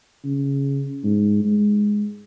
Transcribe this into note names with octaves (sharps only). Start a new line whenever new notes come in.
C#3
G#2
G#3